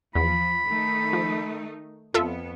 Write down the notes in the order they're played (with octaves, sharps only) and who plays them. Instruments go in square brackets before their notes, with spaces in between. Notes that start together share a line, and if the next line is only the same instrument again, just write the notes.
[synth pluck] E2 [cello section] F3 [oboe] B5
[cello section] D#3 A3 D#4
[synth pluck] F3
[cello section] F2 B3 [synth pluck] F4 A4 E5